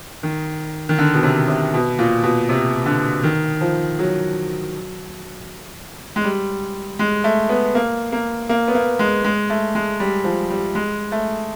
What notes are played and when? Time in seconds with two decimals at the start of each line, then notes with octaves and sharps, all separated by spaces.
0.23 D#3
0.89 D#3
0.98 D3
1.14 B2
1.23 C3
1.48 C3
1.74 B2
1.99 A#2
2.23 B2
2.49 C3
2.86 D3
3.23 D#3
3.61 F3
3.99 F#3
6.16 G#3
6.24 G3
6.99 G#3
7.24 A3
7.49 B3
7.75 A#3
8.12 A#3
8.49 A#3
8.68 B3
8.75 A#3
8.99 G#3
9.24 G#3
9.50 A3
9.75 G#3
10.00 G3
10.24 F3
10.50 G3
10.75 G#3
11.12 A3